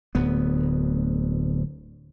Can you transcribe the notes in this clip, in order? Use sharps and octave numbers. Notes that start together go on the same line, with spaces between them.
D1 D2 B3